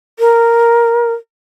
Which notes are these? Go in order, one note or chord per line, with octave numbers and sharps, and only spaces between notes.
A#4